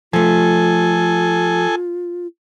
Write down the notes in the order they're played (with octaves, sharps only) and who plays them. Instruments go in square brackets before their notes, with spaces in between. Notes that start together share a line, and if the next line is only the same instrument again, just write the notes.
[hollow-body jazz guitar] F3 A3 [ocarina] F4 [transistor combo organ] A4 G#5